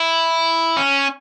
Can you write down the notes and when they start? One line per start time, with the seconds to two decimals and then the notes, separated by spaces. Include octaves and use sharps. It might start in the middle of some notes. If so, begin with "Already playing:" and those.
Already playing: E4
0.77 C#4